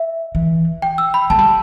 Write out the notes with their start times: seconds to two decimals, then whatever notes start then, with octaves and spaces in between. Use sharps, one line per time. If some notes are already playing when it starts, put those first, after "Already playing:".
Already playing: E5
0.35 E3
0.82 G5
0.98 E6
1.14 B5
1.30 A3 A5
1.39 G3